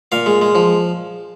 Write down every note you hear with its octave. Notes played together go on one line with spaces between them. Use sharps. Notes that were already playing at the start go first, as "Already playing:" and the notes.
A#2 F5
G#3
G#3
F3